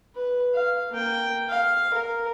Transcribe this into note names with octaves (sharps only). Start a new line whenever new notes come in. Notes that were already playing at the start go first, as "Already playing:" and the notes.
B4
F5
A#3 G5
F5
A#4